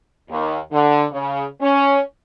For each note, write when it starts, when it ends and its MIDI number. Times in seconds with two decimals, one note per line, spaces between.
0.29 0.57 39
0.71 1.04 50
1.11 1.44 49
1.61 1.99 61